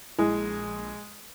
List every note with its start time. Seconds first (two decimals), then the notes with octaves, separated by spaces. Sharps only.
0.19 A#1 G#3 E4 G#4